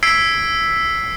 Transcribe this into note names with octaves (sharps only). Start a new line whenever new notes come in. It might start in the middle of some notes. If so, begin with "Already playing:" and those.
E6 G#6 B6 C7 D7